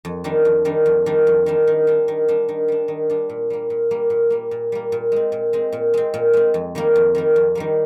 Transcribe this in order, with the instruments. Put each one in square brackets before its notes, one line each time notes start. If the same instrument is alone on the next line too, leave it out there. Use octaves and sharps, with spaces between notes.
[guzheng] F2
D#3 G3 D4
F2
D#3 G3 D4
F2
D#3 G3 D4
F2
D#3 G3 D4
D#3
G3 D4
D#3
G3 D4
D#3
G3 D4
D#3
G3 D4
A#2
G3 A#3
A#2
G3 A#3
A#2
G3 A#3
A#2
G3 A#3
A#2
G#3 C4
A#2
G#3 C4
A#2
G#3 C4
A#2
G#3 C4
F2
D#3 G3 A#3
F2
D#3 G3 A#3
F2
D#3 G3 A#3